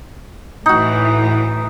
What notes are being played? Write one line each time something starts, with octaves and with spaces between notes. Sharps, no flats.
A2 E3 D#4 F#4